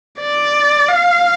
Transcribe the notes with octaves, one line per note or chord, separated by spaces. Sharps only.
D5
F5